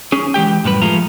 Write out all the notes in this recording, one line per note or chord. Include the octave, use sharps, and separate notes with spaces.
C#4 G#4
E3 G#3 G4 G5
F#2 A2 G3 B4
F3 G#3 A3 F4 A#5